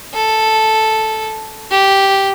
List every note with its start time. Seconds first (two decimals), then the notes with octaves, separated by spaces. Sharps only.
0.14 A4
1.71 G4